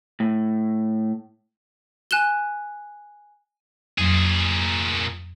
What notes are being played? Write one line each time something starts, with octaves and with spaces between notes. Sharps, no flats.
A2
G#5 F#6 E7 G7
F2 A#2 F#3 G#4